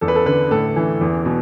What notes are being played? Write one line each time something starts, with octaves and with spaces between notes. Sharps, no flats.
E2 A4
B4
A4
D3 B4
A2 A4
E3
E2
B2